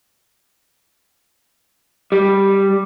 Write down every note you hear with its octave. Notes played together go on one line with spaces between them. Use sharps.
G3